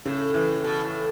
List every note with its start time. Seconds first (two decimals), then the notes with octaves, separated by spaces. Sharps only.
0.05 A2 C#3
0.34 A2 E3
0.64 B2
0.84 A2